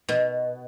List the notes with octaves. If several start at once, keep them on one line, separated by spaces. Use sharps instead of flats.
B2